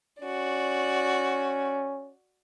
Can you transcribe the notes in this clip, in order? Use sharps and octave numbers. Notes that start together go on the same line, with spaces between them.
C#4 F#4 D5